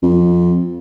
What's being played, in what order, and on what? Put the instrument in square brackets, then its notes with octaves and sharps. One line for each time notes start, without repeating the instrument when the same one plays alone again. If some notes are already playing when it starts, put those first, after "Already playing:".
[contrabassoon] F2